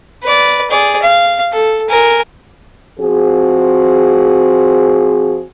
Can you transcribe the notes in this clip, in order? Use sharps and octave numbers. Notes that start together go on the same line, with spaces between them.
B4 D5
G#4 D5
F5
A4
A#4 G#5
F3 C4 F#4 G#4